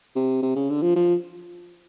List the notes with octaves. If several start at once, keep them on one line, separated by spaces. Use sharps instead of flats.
C3
C3
C#3
D3
F3
F3